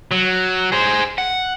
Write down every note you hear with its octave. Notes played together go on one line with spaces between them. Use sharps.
F#3
G#4 C5
F#5